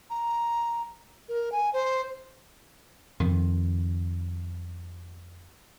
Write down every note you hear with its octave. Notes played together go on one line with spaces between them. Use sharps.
A#5
A#4
G#5
C5
F2 D#3